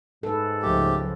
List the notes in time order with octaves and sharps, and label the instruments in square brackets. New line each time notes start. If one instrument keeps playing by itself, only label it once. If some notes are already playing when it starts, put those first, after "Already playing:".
[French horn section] G#2 [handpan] A4 B4
[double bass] C#2 F3 [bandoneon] A3 G4